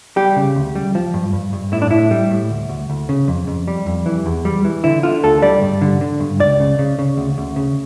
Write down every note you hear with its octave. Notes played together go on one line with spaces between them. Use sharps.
G3 G4
C#3
D2
G3
F3
G2
G2
G2
A2 E4
D4
A2 E4
G3
A2
D2
D2
D2
C#3
F2
F2
G3
F2
E3
E2
G3
E3
D3 E4
D3 F4
D2 A4
G3 D5
G2
D3
D3
G2
C#2 D5
C#3
C#3
C#3
D2
D2
C#3